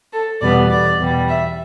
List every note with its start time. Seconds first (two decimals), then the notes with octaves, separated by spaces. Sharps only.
0.13 A4
0.41 E2 B2 G3 B3 D5
0.70 D5
0.99 E2 B2 G3
1.28 E5